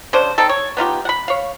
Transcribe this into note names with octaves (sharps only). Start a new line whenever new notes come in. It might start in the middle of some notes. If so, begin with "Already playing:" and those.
C#3 D4 C5
C4 D#4 A4
C#5
B3 D#4 F4 G4
F#5 B5
C#5 F5